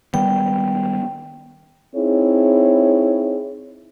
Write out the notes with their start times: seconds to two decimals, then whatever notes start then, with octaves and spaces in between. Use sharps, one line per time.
0.14 D#3 G3 B3 G5
1.96 C4 D#4 E4 G#4 C#5